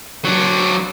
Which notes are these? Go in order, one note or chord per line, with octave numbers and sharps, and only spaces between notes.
F#3 D4